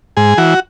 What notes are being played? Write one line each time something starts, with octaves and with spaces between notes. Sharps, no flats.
G#2 G#4
E3 F#4